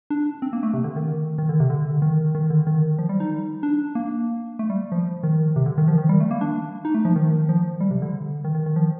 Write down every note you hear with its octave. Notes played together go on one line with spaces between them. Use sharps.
D4
C4
A#3
A3
C3
D3
D#3
D#3
D3
C3
D3
D#3
D#3
D3
D#3
F3
G3
D#4
D4
A#3
A3
G3
F3
D#3
C3
D3
D#3
F3
D#3
G3
A3
A#3
D4
D#4
A3
F3
D#3
F3
G3
C3
D3
D#3
D#3
D#3
F3